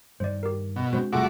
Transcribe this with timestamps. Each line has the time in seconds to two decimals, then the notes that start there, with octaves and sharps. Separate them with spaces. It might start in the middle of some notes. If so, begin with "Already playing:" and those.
0.20 G2 D#3 C5 D5
0.43 G4 A#4
0.76 B2
0.92 G2 G#3 C4 D4 F#4 C5
1.13 E1 C3 G3 A3 F4 F#4 G#4 D6